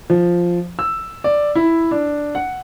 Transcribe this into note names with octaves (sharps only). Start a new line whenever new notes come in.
F3
E6
D5
E4
D4
F#5